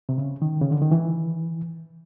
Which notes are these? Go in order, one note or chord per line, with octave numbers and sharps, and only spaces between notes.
C3
C#3
D#3
C#3
D3
D#3
E3